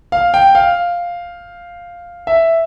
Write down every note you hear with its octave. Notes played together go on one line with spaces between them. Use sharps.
F5
G5
F5
E5